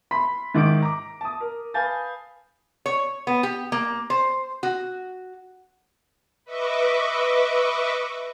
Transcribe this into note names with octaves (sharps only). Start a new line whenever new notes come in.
B5 C6 B6
G#2 D#3 E5 D6 D7
A#5 D6
A5 D#6
A#4
B4 F5 G#5 A5 G6 A6
C#5
B3
G4
A#3
C5
F#4
B4 D#5 E5 C#6 D6